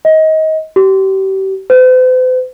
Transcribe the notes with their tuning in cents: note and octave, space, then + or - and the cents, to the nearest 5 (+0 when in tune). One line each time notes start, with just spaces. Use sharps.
D#5 +25
G4 -35
C5 -45